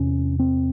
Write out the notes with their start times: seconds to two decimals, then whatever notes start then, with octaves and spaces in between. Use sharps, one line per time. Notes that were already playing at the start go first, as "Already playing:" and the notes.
Already playing: E2 C3 C#4
0.39 C4